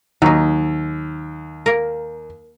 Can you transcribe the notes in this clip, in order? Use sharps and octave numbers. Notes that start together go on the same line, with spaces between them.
D#2 F#3 D#4
A#3 A#4